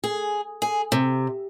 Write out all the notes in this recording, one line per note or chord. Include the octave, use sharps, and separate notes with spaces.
G#4
G#4
C3